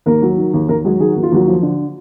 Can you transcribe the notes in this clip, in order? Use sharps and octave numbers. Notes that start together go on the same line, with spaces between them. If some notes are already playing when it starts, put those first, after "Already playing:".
D#2 A#3 A#4
F#3
D#3
D#2
D#2 A#3 A#4
F#3 G#3 G#4
D#3 G#4
D#2 F#4
F4
D#2 F#3 F#4
F3
D3